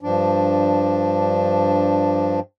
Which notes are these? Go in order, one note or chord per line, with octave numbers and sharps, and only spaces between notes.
G2 F3 D4